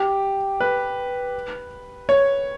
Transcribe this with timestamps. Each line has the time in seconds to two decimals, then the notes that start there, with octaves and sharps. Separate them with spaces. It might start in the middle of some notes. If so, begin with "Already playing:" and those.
Already playing: G4
0.60 B4
2.09 C#5